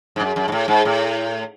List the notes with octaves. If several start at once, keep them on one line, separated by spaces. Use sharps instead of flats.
G#2
F#2
F#2
G#2
A2
G#2
A2